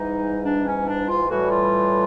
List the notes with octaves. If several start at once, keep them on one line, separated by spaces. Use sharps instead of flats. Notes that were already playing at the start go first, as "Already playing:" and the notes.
Already playing: G#2 E3 G3 D#4
D4
C#4
D4
F4
A2 E3 G3 F#4
F4